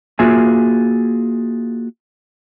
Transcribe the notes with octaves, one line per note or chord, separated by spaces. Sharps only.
A#3 F4 F#4 G#4 E5 G#5